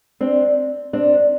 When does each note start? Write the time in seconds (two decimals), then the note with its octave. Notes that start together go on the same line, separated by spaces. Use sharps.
0.21 C4 D4
0.93 C4 D4